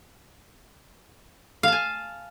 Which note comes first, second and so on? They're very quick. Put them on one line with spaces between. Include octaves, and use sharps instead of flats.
F5 A5 G#5